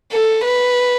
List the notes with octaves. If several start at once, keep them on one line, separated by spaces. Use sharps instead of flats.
A4
B4